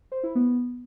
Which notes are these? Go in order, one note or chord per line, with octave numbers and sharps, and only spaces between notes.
C5
E4
B3